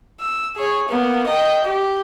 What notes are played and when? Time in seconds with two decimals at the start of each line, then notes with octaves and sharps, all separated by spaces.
0.20 E6
0.57 G#4 C#5
0.89 A#3 B3
1.27 D#5 G5
1.64 G4